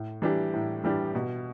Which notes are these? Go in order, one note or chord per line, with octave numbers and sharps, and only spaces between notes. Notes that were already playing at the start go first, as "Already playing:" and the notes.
Already playing: A2
E3 G3 D4 G4
A2
E3 G3 D4 G4
B2